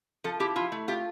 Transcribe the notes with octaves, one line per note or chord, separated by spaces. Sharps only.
F3 A4
E4 G4
E4 F4
A3
F4 G4